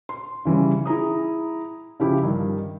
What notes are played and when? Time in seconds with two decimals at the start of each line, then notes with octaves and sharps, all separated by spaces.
0.09 C6
0.45 C#3 E3 G3 C#4
0.86 E4 G#4 A#5 D#6
2.00 C#3 F3 E4 G4
2.23 G2 D#3